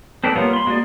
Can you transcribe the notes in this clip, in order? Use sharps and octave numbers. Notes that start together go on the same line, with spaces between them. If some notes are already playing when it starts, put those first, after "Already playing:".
C4 A4 B4 D5
G3 A#3 B3 F4 C#5
B5 C6
G#3 A#3 F#4 G#4 D5